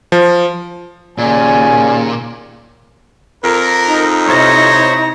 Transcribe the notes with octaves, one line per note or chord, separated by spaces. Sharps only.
F3
D#2 A#2 C#3 D5 G#5
F2 A#4
D#4
C3 E4 C5 C#5 A#6